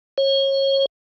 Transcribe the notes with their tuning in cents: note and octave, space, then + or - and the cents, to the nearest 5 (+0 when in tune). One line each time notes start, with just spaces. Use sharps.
C#5 -30